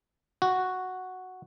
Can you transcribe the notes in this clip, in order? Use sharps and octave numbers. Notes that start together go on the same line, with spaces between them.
F#4